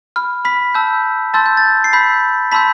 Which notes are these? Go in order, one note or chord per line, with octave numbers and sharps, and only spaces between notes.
B5 F6
B5 B6
A5 E6 G6
A5 C6 E6 G6 A6
G6
A6
C7
B5 E6 G6 B6
A5 B5 C6 E6 G6 B6